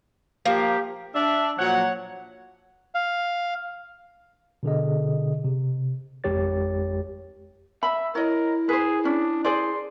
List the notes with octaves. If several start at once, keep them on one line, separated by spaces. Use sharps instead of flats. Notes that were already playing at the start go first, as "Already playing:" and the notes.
F3 A#3 G4
D4 E5
A#2 F3 F#3 C#5 F#5
F5
B2 D3 G#4 D#5
C3
G#1 F2 G#3 G4 C#5 A6
E5 B5
E4 A#4 C#5 D#5
G#4 B4 C5
C#4 D4
G#4 C5 D5 C6